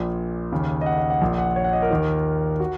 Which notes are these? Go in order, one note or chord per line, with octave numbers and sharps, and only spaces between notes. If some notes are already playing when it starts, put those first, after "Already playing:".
Already playing: A#1 A#2
D#2 C#3
D#5
F#5
D#5
F#5
A#1 A#2
F#5
C#5
F#5
D#5
A#4
D#2 D#3
F#4